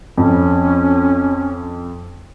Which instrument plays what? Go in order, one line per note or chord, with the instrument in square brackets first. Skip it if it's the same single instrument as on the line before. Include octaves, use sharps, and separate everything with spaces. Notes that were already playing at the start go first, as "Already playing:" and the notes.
[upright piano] F2 [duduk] C#4